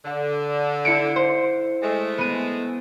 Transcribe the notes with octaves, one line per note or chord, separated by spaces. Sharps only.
D3
E4 C#7 D7
C5
G#3 A3
B3 D#7